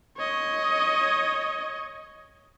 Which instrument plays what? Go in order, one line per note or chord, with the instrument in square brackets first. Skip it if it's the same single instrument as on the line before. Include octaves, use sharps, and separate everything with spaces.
[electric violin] C#5 D#5